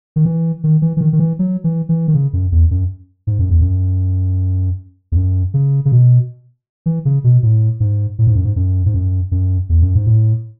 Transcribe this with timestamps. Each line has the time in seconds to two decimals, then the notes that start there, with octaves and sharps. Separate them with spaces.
0.16 D#3
0.25 E3
0.64 D#3
0.82 E3
0.97 E3
1.01 D#3
1.13 D#3
1.20 E3
1.39 F#3
1.64 E3
1.89 E3
2.08 D#3
2.14 C#3
2.33 F#2
2.52 E2
2.71 F#2
3.27 G#2
3.39 F#2
3.50 E2
3.61 F#2
5.12 E2
5.17 F#2
5.54 C#3
5.85 C#3
5.92 B2
6.86 E3
7.05 C#3
7.24 B2
7.43 A2
7.80 G#2
8.19 A2
8.27 G#2
8.35 F#2
8.44 G#2
8.56 F#2
8.86 G#2
8.94 F#2
9.31 F#2
9.69 E2
9.82 F#2
9.95 G#2
10.07 A2